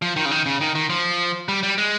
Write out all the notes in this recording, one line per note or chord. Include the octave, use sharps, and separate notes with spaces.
F3
D#3
C#3
D#3
C#3
D#3
D#3
F3
G3
G3
G#3